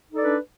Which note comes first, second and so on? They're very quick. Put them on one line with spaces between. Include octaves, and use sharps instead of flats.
D#4 A4 D5 B4 D4